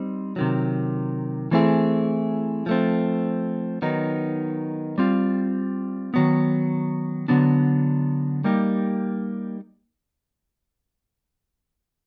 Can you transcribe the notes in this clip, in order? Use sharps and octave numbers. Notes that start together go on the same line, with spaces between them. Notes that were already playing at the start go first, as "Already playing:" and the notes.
Already playing: G3 C4 D#4
C3 D#3 F#3
E3 A3 C4 E4 G#4
F3 A3 C4
D#3 F#3 B3 D#4
G3 C4 F4
D#3 F#3 B3
D3 F#3 B3 D4
G3 A#3 D#4 G4